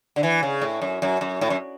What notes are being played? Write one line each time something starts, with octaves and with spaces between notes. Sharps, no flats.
D3
E3
C#3
A2
F#2
F#2
F#2
A2
F#2